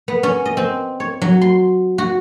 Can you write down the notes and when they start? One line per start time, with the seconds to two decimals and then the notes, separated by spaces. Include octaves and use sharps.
0.08 B3
0.23 C#4
0.46 D#5
0.57 C4
1.00 C#5
1.22 F#3
1.41 C6
1.98 F#4